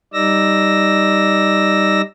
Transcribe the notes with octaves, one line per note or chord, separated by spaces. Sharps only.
G3 D#4 D5 E6 A#6